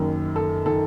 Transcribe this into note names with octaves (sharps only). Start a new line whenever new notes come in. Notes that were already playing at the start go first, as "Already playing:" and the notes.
Already playing: F#1 F#2 D#3
A4
D#3 A4